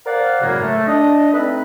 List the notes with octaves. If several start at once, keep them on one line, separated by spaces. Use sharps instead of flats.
A#4 C5 D5 F5 F#5
F#2 A2 C#3 F#3 G#3 A#3
A3
D4 D#5
A3 C4 D#4 B4